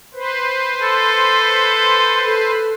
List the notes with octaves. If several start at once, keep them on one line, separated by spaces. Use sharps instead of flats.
B4 C5
A4 C6
A4